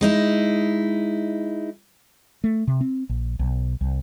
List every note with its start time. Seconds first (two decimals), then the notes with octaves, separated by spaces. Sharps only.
0.01 G#3 D#4 E4
2.44 A3
2.67 C3
2.81 C4
3.09 A#1
3.39 B1
3.81 C2